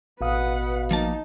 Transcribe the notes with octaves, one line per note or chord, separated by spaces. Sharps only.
A1 B2 B4 F5 F#5 D#6
F3 A#3 D#4 A5